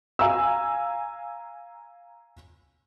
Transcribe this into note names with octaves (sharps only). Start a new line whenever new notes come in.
F5 G#5 A#5 E6